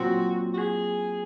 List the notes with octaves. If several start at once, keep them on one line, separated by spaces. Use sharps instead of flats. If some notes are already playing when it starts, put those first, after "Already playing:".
Already playing: A#2 F#3 C4 F#4
F#4
G#4